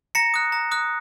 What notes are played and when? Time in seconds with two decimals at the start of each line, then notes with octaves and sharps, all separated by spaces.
0.15 A#5 A#6 C#7
0.34 D#6 F#6
0.52 A#5
0.71 D#6 F#6